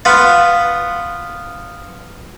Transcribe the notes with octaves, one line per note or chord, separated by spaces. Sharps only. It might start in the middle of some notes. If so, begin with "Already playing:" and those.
B3 F4